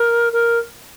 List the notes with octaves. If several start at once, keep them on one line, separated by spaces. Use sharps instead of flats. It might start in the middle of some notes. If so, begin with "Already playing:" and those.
Already playing: A#4
A#4